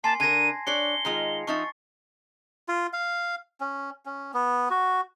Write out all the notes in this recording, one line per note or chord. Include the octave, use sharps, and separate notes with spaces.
A#3 G#5 A5 C6 C7
D3 A#4 A5 G#6 A#6 D#7
D4 C#5 D5 C7 C#7 G7
D#3 G#3 F4
F3 D#4 E5 C#6 A6
F4
F5
C#4
C#4
B3
F#4